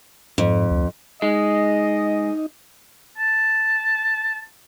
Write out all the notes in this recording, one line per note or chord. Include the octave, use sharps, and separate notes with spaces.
F2 G#2
D2
G#3 D#4 D#5
A5